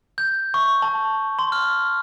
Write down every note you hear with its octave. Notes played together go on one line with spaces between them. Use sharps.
G6
C#6
A5
C6
F6